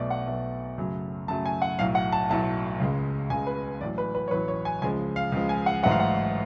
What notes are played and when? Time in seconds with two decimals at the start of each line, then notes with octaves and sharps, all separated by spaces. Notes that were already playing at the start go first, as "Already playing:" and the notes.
Already playing: B1 B2 A3 D5
0.10 F#5
0.27 B1 B2 A3
0.78 F#2 C#3 F#3 A3
1.28 F#2 C#3 F#3 A3 A5
1.46 G#5
1.62 F#5
1.79 B1 A2 F#3 A3 F5
1.95 F#5
2.12 A5
2.29 B1 A2 F#3 A3 A5
2.80 C#2 C#3 G#3
3.30 C#2 C#3 G#3 G#5
3.47 B4
3.81 A1 A2 F#3 D5
3.98 B4
4.15 B4
4.28 C#5
4.31 A1 A2 F#3 B4
4.48 C#5
4.65 G#5
4.82 C#2 C#3 F3 G#3 G#5
5.16 F5
5.32 C#2 C#3 F3 G#3
5.49 G#5
5.66 F#5
5.83 A1 G#2 F#3 A3 F#5
5.91 F5
6.00 F#5